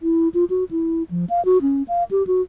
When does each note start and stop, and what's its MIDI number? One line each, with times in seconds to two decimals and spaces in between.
0.02 0.28 64
0.34 0.44 65
0.50 0.64 66
0.71 1.03 64
1.11 1.25 53
1.30 1.44 77
1.45 1.58 66
1.62 1.83 61
1.88 2.04 77
2.11 2.26 67
2.27 2.42 66